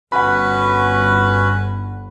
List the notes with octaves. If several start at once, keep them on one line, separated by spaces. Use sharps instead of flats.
G1 C#4 F#4 B4 F#5 B5